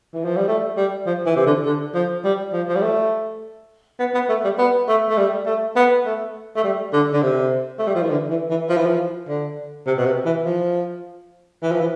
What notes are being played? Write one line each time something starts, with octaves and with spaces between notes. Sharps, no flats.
E3
F3
G3
A3
G3
F3
E3
C3
D3
D3
F3
G3
F3
F3
G3
A3
B3
B3
A3
G3
B3
A3
A3
G3
A3
B3
A3
A3
G3
D3
D3
C3
A3
G3
F3
E3
D3
E3
E3
F3
E3
F3
D3
C3
B2
C3
E3
F3
E3
F3
E3